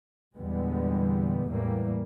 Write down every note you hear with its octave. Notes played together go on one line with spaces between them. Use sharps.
E2 A#2 D3 G3 G#3 B3
E2 A2 E3 G3 A#3